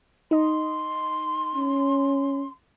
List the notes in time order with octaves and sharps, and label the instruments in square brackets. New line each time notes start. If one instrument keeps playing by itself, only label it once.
[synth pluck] D#4 D#5 [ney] C6
[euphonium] C#4